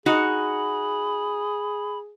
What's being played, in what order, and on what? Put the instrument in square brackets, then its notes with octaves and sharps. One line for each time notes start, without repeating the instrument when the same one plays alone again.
[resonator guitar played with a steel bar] D#4 F#4 F#5 [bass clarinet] G#4 [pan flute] B5